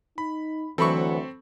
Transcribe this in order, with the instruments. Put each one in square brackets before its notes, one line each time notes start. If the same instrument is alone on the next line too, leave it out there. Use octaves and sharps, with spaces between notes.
[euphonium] D#4 [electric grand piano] B5
[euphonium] D2 [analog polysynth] E3 F#3 [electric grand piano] C4 [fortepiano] A4 B5 C#6